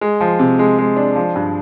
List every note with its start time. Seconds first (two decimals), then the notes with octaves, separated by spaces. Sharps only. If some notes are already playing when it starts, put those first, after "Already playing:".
0.01 G#3
0.21 F3
0.39 C3
0.59 G#3
0.79 G#3
0.97 D4
1.16 F3
1.36 G2